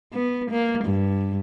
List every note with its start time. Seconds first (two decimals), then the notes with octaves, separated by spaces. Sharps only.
0.13 B3
0.51 A#3
0.85 G2